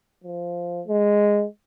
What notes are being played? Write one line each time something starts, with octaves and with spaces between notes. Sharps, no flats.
F3
G#3